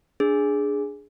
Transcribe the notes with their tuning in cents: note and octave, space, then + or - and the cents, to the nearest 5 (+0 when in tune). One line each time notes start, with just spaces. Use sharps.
D4 +0 G#4 +0